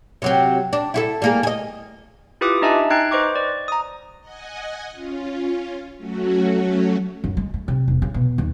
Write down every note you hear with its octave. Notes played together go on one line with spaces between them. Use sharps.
C3 F#3 C4
D4
E4 F#4 A4
G3 A#3 G#4
G#4 D#5
E4 F4 G4 B4 D6 D#6
D4 D#4 D#5 E5 G#5 A5
D#4 G5 F#6 G#6 C7
B4 C5 D#5 C#6 D6
D5
A#5 D#6
D#5 F#5 G#5
C#4 F4
F#3 A3 C#4 F#4
F#2
G#3
A3
C3
E1
C#3
B2
D#2